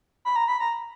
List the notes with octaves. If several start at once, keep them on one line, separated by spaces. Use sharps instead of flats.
B5
A#5
B5
A#5